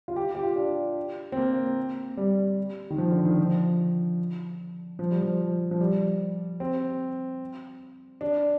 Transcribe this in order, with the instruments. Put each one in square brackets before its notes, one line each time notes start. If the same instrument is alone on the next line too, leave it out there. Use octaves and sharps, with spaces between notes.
[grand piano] F4
G4
G4
F4
D4
C4
A#3
G3
D#3
F3
D3
D#3
F3
F3
G3
F3
F3
G3
C4
D4